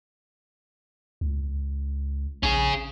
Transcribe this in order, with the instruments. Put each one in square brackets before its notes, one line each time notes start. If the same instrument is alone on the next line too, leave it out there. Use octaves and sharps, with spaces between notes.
[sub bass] C#2
[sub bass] A#1 [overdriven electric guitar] C#4 G#4